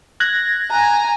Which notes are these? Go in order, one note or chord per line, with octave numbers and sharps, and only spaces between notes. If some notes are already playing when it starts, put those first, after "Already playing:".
F#6 G#6 A#6
G#5 A#5